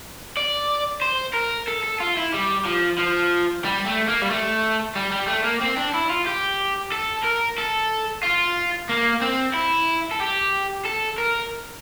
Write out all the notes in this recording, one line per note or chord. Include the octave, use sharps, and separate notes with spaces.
D5
C5
A#4
A4
A4
F4
E4
G3
F3
F3
G3
A3
A#3
G3
A3
G3
G3
A3
A#3
C4
D4
E4
F4
G4
A4
A#4
A4
F4
A#3
C4
E4
A4
G4
A4
A#4